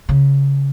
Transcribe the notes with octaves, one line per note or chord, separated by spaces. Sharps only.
C#3